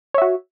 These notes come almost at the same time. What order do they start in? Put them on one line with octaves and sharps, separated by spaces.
C#5 E5 F#4